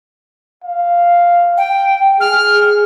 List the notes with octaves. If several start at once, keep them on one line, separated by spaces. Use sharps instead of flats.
F5
G5
G#4 F6